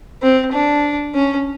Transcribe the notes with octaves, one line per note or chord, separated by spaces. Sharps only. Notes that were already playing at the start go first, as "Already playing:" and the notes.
C4
D4
C#4